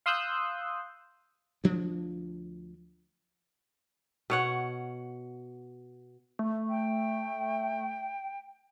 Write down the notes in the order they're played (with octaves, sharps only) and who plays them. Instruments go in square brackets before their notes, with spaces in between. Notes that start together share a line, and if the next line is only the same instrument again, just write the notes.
[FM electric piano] F5 C6 D#6 E6 F#6 G6
[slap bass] D2 F3 D4
[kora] B2 C#5 F#5
[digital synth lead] A3
[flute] G5